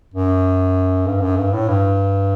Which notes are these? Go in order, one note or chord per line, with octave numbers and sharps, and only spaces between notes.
F#2
G2
F#2
G2
A2
G2